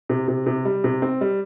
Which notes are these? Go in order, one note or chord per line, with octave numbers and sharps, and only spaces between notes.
C3
C3
C3
G3
C3
C4
G3